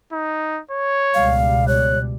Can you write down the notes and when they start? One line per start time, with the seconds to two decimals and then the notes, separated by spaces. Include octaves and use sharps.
0.13 D#4
0.71 C#5
1.14 C#2 B2 G3 F5
1.68 C#5 F#6